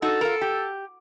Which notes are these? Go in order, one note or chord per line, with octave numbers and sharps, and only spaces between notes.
D#4 F#4 A4
F4 A#4
G4